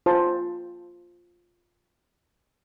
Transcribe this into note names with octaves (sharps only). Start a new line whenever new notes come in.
F4 C5 A5